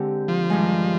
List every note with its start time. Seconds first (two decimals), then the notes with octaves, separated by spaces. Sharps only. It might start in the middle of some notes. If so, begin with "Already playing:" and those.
Already playing: D3 G#3 C4 G4
0.28 F3
0.50 G2 D#3 G#3